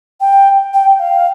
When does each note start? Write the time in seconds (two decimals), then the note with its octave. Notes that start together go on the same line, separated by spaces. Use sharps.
0.20 G5
0.74 G5
0.99 F5